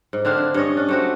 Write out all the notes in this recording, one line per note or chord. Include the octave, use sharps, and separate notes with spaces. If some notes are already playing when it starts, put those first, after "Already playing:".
G#2
D3 C4 D4 F5
D3 E4
G2 C#4 C#5 D#5
C#4 D4
A3 C4 F#4